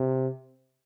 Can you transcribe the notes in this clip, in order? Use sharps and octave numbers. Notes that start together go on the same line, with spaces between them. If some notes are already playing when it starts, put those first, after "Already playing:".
Already playing: C3